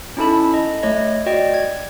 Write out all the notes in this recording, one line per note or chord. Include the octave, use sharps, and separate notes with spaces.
C#4 D#4 E4 A4 A5 B5
D#5
A3 C#5 D#5
F#4 D5 D#5 G5
G#6